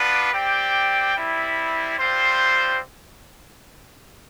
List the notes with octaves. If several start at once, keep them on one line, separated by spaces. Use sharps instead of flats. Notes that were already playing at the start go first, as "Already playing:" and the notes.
Already playing: B3 D4 F4 B4 D5
C4 G4 D5 G5
G3 C4 E4
G3 C4 F4 C5